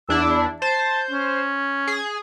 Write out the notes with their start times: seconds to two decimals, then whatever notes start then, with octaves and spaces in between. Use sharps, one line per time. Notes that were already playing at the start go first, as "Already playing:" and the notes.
0.09 E2 D4 E4 E6
0.62 C5 A5
1.11 C#4
1.87 G#4